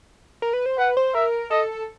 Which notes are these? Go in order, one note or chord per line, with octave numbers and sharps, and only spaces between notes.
A#4
B4
C5
B4 F#5
C5
A#4 E5
A4 D#5